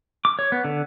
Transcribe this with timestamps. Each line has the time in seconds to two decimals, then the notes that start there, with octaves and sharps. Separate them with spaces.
0.25 D6
0.39 C#5
0.52 B3
0.65 D3